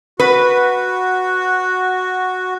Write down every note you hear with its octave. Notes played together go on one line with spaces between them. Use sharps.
F#4 B4